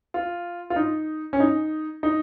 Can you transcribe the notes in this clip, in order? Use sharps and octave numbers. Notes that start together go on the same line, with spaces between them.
F4
F4
D#4
C#4
D#4
D#4